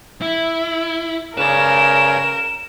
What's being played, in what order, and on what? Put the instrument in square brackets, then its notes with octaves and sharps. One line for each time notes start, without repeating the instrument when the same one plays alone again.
[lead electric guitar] E4
[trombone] C#3 [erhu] A#4 [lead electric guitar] B4 D5 [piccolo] E7